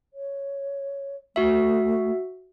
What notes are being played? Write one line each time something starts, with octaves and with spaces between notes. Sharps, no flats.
C#5
A3 F#4 E5